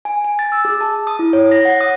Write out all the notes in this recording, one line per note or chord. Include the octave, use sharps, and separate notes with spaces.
G#5
G#5
A6
E6
G#4
A5
D#6
E4
C#5
A#6
F#5
D#6